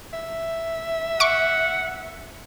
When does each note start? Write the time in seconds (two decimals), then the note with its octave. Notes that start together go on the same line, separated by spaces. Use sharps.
0.13 E5
1.20 F#5 C#6 D6